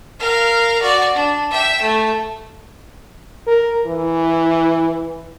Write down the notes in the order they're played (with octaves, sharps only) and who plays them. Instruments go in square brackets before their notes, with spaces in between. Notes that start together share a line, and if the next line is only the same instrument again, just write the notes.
[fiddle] A#4 F5
F#4 D5
D4
E5 G5
A3
[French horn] A#4
E3